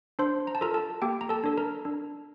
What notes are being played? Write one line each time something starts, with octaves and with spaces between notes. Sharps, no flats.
D4 C5 C6
A#5
A5
F4 A4 A#4 A#5
A4 A5
A#3 G4 G5
A#5
A4 A5
D4 A4
A#4 A#5
D4